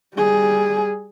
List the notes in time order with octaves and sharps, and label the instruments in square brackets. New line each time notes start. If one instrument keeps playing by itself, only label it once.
[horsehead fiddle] G3 G#4